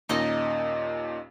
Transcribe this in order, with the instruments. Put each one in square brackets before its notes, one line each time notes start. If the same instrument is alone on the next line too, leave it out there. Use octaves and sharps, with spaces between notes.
[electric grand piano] D#2 A#2 C#4 [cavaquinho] D#4 D#5